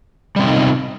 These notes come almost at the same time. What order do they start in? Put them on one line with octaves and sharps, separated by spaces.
G3 C4 C3 D#4 F4